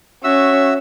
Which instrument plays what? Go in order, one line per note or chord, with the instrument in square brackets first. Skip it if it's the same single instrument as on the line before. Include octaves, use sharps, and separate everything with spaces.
[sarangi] C#4 [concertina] F#4 E5 E6